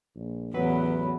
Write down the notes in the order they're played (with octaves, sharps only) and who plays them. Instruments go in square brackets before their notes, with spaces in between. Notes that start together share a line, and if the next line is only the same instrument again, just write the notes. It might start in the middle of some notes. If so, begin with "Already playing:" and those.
[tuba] A#1
[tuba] A1 [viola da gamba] E2 [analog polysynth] F#3 B4